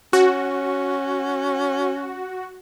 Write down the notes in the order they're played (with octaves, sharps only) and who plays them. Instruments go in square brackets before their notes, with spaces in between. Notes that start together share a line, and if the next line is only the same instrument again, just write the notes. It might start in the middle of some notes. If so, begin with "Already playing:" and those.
[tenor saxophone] C#4 [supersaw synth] F#4